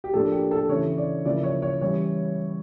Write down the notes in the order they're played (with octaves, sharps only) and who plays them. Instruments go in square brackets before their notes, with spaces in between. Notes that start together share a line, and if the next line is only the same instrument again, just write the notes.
[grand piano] G4
A2 F3 A#3 D4 A4
G4
A4
C#3 E3 A3 C#4 E4 C#5
D5
C#3 F3 A#3 E4 D5
C#5
C#5
E3 G3 C#4 E4 C#5